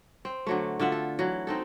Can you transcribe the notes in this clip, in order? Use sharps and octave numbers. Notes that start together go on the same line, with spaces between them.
C4
D3 F#3 A3
D3 F4 E5 F#5
A4
E3 F#3
C4 D#4 A4